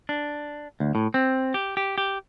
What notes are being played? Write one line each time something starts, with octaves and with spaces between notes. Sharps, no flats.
D4
D2
A2
C4
G4
G4
G4